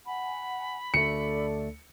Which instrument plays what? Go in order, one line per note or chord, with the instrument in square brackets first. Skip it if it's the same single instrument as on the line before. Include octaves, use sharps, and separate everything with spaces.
[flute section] F#5 G#5 [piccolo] B5
[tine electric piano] D2 A3 [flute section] D4 A4 D5 [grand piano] C#7